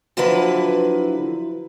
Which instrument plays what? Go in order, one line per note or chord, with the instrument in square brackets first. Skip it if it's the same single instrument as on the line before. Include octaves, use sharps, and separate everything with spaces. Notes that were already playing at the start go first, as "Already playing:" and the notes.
[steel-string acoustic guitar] D3 F3 F#3 E4 B4